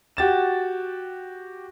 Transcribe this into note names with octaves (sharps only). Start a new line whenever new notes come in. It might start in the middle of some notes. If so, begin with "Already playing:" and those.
F#4 G4 A6 E7